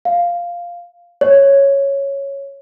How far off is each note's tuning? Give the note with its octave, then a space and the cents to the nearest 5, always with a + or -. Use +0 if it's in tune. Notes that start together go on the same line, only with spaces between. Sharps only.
F5 +0
C#5 -5